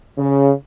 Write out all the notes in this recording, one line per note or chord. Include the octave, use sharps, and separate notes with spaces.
C#3